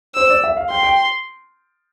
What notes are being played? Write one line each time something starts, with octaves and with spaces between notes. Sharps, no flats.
C5 E6
D5
E5
F5
G5 C6
G5